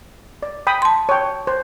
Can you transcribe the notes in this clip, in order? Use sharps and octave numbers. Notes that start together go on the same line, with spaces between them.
D5
G5 B5 D#6
A5 C6
C#5 G5
C5